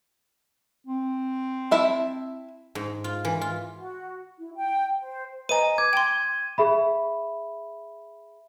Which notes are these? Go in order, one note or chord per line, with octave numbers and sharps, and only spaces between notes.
C4
E4 E5 A5
G#2
F4
E3
F4
F#4
E4
G5
C5
B4 C5 D#5 G#5 A#5 D#7
D6 G#6
G5 C6
G#4 E5 B5